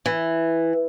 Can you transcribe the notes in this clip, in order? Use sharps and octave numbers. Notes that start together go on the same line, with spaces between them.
E3